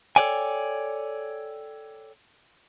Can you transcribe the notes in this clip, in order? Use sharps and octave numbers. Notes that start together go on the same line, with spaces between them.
A4 B4 C#5 D5 G5 G#5